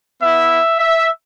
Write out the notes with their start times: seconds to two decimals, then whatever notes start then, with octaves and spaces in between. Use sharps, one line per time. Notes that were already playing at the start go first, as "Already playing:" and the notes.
0.21 B3 E4 E5
0.78 E5